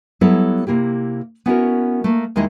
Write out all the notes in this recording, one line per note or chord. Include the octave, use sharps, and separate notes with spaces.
F#3 G3 B3 E4 A4 C#5
C3 A#3 E4 G4
B3 C#4 E4 F#4 A4 A#4
A3 A#3
D#2 G#3 D#4 E4 D#5 E5